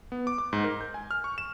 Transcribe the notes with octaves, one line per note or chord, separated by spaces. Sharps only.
B3
D6
D6
G#2
A#4
G6
G#5
F6
C#6
E7